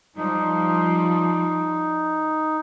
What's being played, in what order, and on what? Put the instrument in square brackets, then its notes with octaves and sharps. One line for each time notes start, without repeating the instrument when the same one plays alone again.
[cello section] F3 G3 [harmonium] D#4